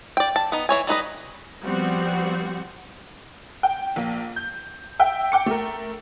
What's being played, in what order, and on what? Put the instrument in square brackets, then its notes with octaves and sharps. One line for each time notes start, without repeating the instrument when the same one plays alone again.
[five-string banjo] D5 G5
A5
B3 D#4
E3 C#5 G#5
G3 D#4 B4 D#5
[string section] F3 G3 B3 C4 F#4
[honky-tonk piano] G5
A#1 A#3
G6
E5 G5
G5 D6 C#7
A3 A#4